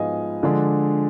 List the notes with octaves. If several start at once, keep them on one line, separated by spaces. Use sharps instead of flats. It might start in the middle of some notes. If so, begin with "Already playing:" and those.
Already playing: G#2 F3 B3 D#5 F5 G#5
D3 F3 G#3 D4